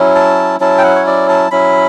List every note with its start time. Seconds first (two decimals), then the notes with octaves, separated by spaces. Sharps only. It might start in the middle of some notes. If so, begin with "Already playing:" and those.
Already playing: F#3 C#4 E4
0.15 A5
0.60 F#3 C#4 E4 A5
0.78 G5
0.83 F#5
0.95 C#5
1.07 D5
1.29 A5
1.51 F#3 C#4 E4 B5